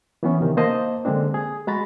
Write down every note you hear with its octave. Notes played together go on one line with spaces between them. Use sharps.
E3 B3 C#4
C3 D#3
A#3 C5 D#5 A5
D3 G#3 A#3 C4 D4
G#4
G#3 F#4 A#5 B5 A6